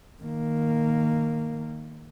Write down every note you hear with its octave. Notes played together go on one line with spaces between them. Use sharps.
D#3 A#3